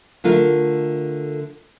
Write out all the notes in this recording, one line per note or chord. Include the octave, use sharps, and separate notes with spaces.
D3 A3 F4 A#4